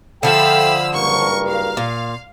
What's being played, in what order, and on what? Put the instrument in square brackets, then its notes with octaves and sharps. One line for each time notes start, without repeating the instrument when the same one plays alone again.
[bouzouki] D3 F3 [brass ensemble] A4 E5 G5 [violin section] F5 B5 E6
[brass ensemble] F#1 G2 A#4 [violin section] C#6
[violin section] F5
[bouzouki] A#2